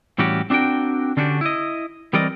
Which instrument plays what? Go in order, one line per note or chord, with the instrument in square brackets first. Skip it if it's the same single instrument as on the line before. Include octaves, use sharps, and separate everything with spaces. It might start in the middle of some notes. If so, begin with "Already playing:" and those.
[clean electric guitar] A2 E3 G3 C#4 F#4 G4
C4 D4 F#4 A#4 G5
D3 C#4 D4 F#4 G4
E4 D#5
E3 G3 C4 A#4 D5 D#5